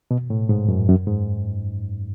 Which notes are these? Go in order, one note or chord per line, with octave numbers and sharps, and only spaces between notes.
B2
A2
G#2
F#2
F#2
G#2